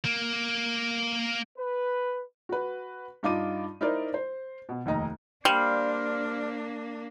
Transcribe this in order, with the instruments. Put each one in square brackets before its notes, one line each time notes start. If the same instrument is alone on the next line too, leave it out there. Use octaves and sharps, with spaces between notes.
[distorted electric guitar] A#3
[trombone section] B4
[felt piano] F#4 B4
G2 D#4 F4 D6 D#7
D#4 E4 A#4 C5 D5
C5
B2
F1 D#2 D#5 A#5
[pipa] G3 [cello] A#3 D4 [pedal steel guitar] C5 F5